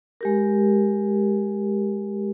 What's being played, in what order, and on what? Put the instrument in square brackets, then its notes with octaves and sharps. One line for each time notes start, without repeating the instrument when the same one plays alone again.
[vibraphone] G#3 G4 A#4